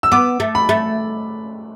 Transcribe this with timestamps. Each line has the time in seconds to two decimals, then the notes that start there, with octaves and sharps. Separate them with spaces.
0.03 E6
0.12 B3 D6
0.40 A3
0.55 B5
0.69 A3